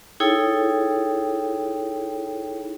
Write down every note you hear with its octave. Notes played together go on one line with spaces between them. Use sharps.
D#4 E4 G#4 A4 C#5 G5